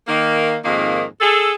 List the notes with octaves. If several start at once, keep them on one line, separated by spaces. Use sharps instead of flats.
D#3 A#3
F2 G#2 D#3 A#3
G#4 A4